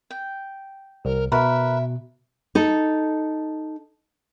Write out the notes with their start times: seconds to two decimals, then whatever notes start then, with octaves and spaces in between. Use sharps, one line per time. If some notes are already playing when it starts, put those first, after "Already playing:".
0.10 G5
1.05 C2 A#4
1.32 B2 A#4 B4 E5
2.55 D#4 A4